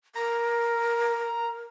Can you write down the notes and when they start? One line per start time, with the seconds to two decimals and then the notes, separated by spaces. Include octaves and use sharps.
0.15 A#4 A#5